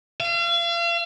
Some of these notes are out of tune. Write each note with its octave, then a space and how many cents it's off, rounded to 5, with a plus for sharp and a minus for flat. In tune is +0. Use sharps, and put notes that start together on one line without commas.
F5 -40